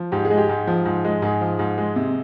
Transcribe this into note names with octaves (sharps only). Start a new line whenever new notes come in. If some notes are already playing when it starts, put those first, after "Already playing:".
Already playing: F3
G#2 G4
G#4
G#3
G4
G#2
F3
G#2
G#3
G#2 G#4
F3
G#2
G#3
C3